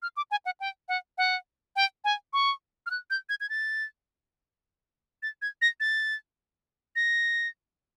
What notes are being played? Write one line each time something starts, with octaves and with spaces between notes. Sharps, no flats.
F6
D6
G#5
F#5
G5
F#5
F#5
G5
G#5
C#6
F6
F#6
G6
G#6
G#6
A6
A6
G#6
A#6
A6
A#6